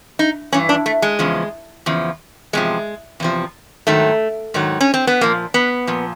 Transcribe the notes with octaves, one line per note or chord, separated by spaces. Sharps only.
D#4
G2 E3 C#4
D4
A3
G#3
E2 C#3 F3
E2 C#3 F3
E2 C3 F3 G#3
E2 C3 F3
G#2 D#3 F#3 A3
G#2 D#3 F#3
C#4
C4
B3
A#2 F3 A#3
B3
A#2 F3